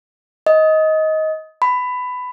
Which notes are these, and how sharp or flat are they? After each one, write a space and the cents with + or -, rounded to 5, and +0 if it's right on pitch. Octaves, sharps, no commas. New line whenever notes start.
D#5 +15
B5 +15